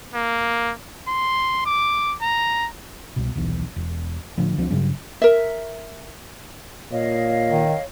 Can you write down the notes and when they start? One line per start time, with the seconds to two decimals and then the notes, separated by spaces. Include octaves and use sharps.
0.14 A#3
1.08 C6
1.66 D6
2.21 A#5
3.16 C2 B2
3.36 D#1 B1 E3
3.76 E1
4.38 A2 D3 F3
4.57 C#2 F3 C4 D4
4.71 G2 C#3 F#3
5.22 A#4 E5
6.92 A#2 C#5 D#5 F5
7.50 D#3